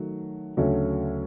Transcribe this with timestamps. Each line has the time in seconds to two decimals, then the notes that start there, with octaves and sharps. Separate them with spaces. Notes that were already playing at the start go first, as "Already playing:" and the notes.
Already playing: D#3 F#3 A3
0.57 D2 C#3 F#3 A3 C#4